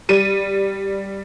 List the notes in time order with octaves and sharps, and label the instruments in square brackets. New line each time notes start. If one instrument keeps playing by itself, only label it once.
[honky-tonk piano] G3 D#7